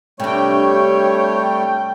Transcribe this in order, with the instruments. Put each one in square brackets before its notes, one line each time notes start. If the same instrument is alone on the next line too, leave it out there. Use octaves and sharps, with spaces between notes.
[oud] C3 D4 [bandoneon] G3 A3 [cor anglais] C#5 [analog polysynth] G5